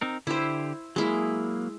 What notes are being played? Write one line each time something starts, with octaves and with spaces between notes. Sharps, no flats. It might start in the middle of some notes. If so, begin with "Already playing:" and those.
C4 D#4 A#4
D3 E4 G4 C5
F#3 G#3 A#3 E4